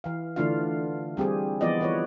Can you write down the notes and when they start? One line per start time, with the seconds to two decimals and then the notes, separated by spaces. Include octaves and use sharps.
0.04 E3 F5
0.36 D3 E3 A3 D4 F4 F5
1.17 G3 C4 G4 G#4
1.61 E3 F3 B3 F4 D5 D#5
1.81 E3 B4 C#5